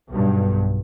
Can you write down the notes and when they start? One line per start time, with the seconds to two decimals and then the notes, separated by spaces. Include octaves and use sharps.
0.11 B1 G2